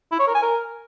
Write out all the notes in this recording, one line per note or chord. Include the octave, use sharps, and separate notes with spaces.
E4
C#5
A#4
G#5
A#4